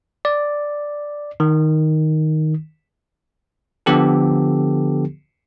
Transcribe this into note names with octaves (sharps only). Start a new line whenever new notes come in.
D5
D#3
D3 F3 B3 G4 A4